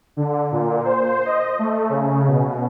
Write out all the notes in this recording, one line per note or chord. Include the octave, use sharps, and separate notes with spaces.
D3
A#2
C5
D#5
A3
C#3
B2